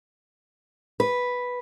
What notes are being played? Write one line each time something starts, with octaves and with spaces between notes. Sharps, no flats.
B4